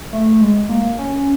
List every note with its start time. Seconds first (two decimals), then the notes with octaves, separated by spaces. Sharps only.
0.13 A3
0.41 G#3
0.69 A#3
0.99 C#4